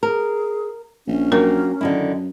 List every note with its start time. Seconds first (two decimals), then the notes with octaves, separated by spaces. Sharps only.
0.03 G#4 A#4
1.07 A#1 C#4
1.32 F#3 A#3 A#4 G5
1.81 F#2 D3 D#3 E4